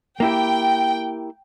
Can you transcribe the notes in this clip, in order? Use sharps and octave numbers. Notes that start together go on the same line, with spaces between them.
A#3 E4 G4 G5